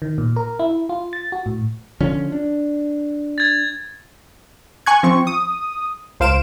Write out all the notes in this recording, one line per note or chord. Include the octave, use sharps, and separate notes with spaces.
D#3
A#2
A#4
E4
F4
A6
F#4
A2
D3 F3 C#4
D4
G#6 A6
G#5 C#6 F#6 G#6
F3 C4 C#6
D#6
C#2 C5 F5 D7 E7